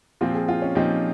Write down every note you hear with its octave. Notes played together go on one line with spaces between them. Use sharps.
A#2 F3 C4 F4 G4
G#4
F4
C#4
A#2 F3 C4 D#4 G4